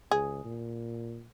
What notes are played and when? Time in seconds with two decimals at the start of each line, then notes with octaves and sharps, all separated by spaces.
0.11 C#2 G#4
0.45 A#2